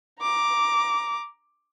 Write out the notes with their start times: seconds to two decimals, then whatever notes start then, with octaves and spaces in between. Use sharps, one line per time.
0.20 A#5 D6